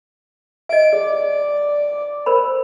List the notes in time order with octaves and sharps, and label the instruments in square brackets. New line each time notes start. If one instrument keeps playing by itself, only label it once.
[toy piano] D#5 E5 [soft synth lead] D7
[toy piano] G#4 [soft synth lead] D5
[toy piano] A#4 C5 B5